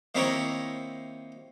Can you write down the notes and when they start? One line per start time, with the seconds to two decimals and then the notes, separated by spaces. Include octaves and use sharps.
0.15 D#3 A#3 C4 E4 A#4 C#5